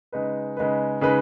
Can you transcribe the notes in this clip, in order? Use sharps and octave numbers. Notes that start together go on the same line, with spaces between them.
C#3 G#3 D#4 B4
C#3 G#3 D#4 B4
C#3 G#3 D#4 B4